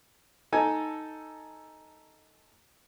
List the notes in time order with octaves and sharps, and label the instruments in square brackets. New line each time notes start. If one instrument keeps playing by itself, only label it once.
[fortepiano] D#4 A4 G#5